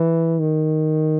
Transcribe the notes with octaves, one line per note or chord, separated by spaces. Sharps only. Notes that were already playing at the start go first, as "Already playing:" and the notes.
Already playing: E3
D#3